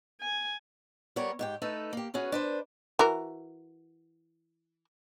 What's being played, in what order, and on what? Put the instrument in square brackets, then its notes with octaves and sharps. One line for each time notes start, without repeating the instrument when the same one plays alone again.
[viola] G#5
[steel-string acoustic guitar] G3 B3 A#4 C#5
G#2 G4 G5
A3 D#4 A4 B4
A#3 G4
C#4 F#4 G#4 B4
D4 B4 C5
[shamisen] E3 F#4 A#4